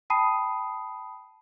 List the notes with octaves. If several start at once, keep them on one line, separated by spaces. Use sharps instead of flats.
G5 A5 B5 D#6 C7 D#7